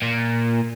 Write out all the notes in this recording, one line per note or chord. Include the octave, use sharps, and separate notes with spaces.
A#2